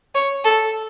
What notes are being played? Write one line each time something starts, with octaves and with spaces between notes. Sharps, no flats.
C#5
A4